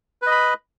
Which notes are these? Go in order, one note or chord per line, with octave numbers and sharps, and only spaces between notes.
B4 D#5 B5